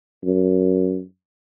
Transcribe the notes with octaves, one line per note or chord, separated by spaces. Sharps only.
F#2